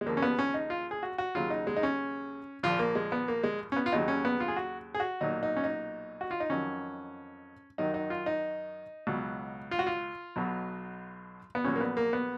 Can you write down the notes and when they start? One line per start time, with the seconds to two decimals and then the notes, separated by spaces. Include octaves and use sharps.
0.01 G#3
0.06 D#2 C#3 F3 A#3
0.17 C#4
0.22 B3
0.39 C#4
0.54 D#4
0.70 F4
0.91 G#4
1.03 F#4
1.18 F#4
1.35 D#2 C#3 F#3 F4
1.50 D#4
1.67 G#3
1.77 D#4
1.83 C#4
2.63 A#1 A#2 F3 F4
2.79 A#3
2.95 G#3
3.12 B3
3.28 A#3
3.43 G#3
3.72 C#4
3.76 B3
3.86 F4
3.92 D#2 C#3 F#3 D#4
4.08 C#4
4.25 B3
4.40 F4
4.48 G#4
4.57 F#4
4.94 G#4
5.00 F#4
5.21 B1 A#2 F#3 D#4
5.43 D#4
5.56 C#4
5.64 D#4
6.21 F#4
6.31 F4
6.40 D#4
6.49 F2 D#3 F#3 C#4
7.78 F#2 D#3 F#3 D#4
7.94 D#4
8.10 F4
8.26 D#4
9.07 C#2 B2 F#3
9.71 F4
9.79 F#4
9.87 F4
10.36 B1 B2 F#3
11.55 B3
11.64 A#1 A#2 F#3 C#4
11.76 A#3
11.81 B3
11.97 A#3
12.13 B3